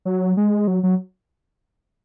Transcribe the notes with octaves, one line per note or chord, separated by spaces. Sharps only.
F#3
G#3
F#3
F#3